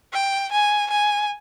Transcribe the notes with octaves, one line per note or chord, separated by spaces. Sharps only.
G5
G#5
G#5